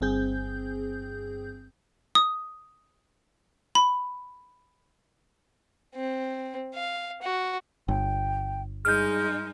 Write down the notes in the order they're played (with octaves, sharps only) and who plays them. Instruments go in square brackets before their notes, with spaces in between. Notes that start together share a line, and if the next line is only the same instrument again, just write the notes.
[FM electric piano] G1 G2 C4 G#4 G6
[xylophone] D#6
B5
[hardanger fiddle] C4
F5
F#4
[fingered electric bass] G1 [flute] G5
[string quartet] G2 G#3 D#4 [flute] G#4 [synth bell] F6 G6